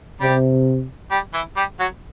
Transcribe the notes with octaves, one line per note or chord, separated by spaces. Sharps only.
C3 G3 G4
G3 G4
E3 E4
G3 G4
F#3 F#4